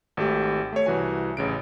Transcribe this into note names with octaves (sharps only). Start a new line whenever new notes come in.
G#1 A3 G4
A3 C#5
C2 E3 F#4 G#5
A1 C#3 D7